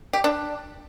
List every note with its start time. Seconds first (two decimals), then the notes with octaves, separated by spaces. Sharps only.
0.13 G4
0.24 D4